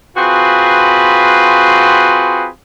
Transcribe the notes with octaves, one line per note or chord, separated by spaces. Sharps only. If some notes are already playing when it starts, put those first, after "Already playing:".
C4 F4 F#4 G#4 B4